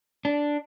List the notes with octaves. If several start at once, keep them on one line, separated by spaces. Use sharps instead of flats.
D4